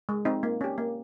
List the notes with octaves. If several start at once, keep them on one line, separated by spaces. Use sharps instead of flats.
G#3
C4 D#4
A#3
C#4 G4
A#3